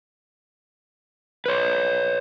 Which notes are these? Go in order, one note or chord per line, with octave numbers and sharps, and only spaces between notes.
B4 C#5